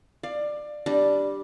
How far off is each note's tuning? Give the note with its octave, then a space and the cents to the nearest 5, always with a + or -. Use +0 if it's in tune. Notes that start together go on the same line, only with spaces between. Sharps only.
D5 +20 F5 +0
G3 +0 D4 +0